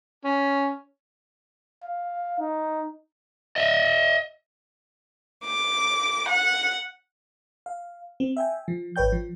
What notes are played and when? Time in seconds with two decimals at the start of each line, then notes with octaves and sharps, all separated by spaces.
0.25 C#4
1.84 F5
2.40 D#4
3.56 D#5 E5
5.45 D6
6.27 F#5
7.66 F5
8.20 C4
8.37 E5 G5 G#5
8.68 F3
8.96 G#1 B4 C#5 G5 G6
9.12 F3